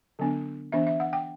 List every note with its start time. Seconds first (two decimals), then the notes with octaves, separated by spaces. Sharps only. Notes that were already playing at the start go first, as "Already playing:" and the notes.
0.19 D3 F#3 B3 D4
0.72 E3 B3 D4 E5
0.87 E5
1.00 F#5
1.13 G5